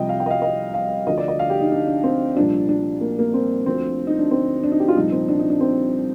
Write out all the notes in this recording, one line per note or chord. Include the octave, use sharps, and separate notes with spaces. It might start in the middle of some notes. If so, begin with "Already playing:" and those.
Already playing: C2 C3 F3 D#5 G5
F5
G5
D#5
F5
D#5
F5
D2 D3 F3 D#5
D5
D#5
F5
G4
D#4
D4
D4
C4
C2 A#2 F3 D4
D4
A#3
A#3
C4
D2 D3 F3 C4
D#4
D4
C4
D4
D#4
G4
F4
C2 A#2 F3 D#4
C4
D4
D#4
D4
C4